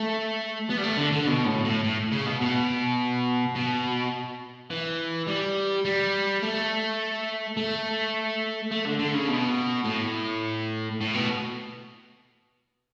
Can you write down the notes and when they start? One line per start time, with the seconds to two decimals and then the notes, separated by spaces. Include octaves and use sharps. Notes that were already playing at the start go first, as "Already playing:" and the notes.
Already playing: A3
0.70 B3
0.77 G3
0.83 A3
0.97 D3
1.12 D3
1.27 B2
1.45 A2
1.64 A2
1.84 A2
2.12 C#3
2.26 B2
2.41 B2
3.55 B2
4.70 E3
5.28 G3
5.85 G3
6.42 A3
7.57 A3
8.71 A3
8.85 D3
8.99 D3
9.14 C#3
9.28 B2
9.85 A2
11.01 A2
11.14 B2